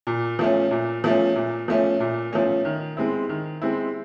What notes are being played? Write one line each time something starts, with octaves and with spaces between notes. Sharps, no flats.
A#2
F3 A3 C#4
A#2
F3 A3 C#4
A#2
F3 A3 C#4
A#2
F3 A3 C#4
D#3
G#3 C4 E4
D#3
G#3 C4 E4